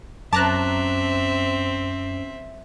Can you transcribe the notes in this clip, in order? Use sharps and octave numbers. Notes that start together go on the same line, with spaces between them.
F#2 C4 C#4 E5 A5 A#5 D6 F#6